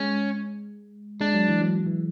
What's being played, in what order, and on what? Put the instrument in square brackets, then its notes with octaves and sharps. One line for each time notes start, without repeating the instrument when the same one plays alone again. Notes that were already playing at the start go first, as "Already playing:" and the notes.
Already playing: [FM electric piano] G#3 [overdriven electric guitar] C#4
[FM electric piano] G#3 [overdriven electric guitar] D4
[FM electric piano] F#3
E3
F#3
E3